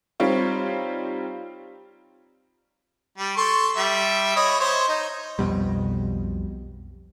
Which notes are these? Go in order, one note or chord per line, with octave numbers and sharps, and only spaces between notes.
G3 C4 D#4 F4 C#5
G3
A4 C6 C#6
G3 E5
C#5 D#5 B5
C5 C#5
D#4
B1 F2 B2 G3